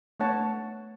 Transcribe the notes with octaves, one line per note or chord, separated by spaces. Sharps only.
A3 B3 D4 C#5 F#5 A5